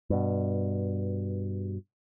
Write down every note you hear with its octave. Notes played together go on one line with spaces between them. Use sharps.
G2 B2